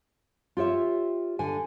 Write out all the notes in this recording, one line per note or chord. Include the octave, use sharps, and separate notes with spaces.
F4 G4 C#5 E5
D3 G#5